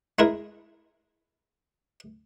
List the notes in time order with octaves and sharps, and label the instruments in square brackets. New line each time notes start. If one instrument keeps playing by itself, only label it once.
[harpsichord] G#3 E4 A#4